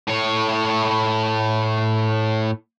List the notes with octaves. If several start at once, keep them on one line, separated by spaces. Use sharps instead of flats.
A2 C#5